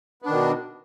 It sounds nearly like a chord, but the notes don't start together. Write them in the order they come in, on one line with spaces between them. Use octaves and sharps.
B3 D4 D#3 B2